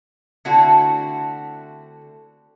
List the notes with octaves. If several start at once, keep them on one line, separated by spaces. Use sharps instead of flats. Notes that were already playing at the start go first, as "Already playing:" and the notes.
D3 A3 C4 D4 E4 F#4